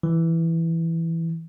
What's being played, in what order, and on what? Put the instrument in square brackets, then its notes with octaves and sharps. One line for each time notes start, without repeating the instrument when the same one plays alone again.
[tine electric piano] E3